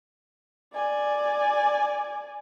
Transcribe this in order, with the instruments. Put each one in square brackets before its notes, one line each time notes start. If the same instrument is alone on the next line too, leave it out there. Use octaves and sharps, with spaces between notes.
[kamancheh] D5 G#5